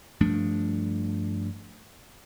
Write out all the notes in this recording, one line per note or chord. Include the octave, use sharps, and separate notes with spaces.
G2 F3 A3 D4